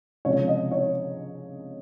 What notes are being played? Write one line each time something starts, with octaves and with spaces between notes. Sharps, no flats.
C#2 C3 F3 C#5
D#5
C#5